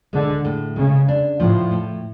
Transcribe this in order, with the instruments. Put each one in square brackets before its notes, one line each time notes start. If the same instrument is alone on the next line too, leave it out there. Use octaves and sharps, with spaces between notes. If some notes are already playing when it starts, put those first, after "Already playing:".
[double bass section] D3 [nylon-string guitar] G#3
[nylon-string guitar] A2
[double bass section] C#3 [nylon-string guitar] G#3
[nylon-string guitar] D4
[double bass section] A2 [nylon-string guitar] F3
[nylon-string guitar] A2